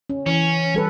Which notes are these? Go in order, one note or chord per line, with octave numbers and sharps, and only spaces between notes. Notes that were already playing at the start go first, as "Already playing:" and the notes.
C#4
E3 C#4
G3 A4 B4